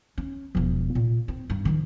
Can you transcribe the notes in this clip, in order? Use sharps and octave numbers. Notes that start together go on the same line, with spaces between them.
C#4
E1 F3
A#2
C4
G2
D#3 F3